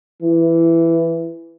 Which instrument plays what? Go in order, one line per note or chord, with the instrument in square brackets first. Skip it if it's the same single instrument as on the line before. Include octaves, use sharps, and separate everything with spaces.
[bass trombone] E3